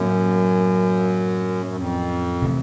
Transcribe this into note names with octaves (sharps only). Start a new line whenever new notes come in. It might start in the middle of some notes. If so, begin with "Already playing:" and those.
Already playing: F#2 A2 F#3 A#3 C#4
F#2
F2
C3 E3 A3